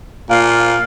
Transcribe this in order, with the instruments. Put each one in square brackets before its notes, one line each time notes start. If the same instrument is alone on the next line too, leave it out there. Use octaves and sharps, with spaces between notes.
[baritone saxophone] A#2 [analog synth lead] F5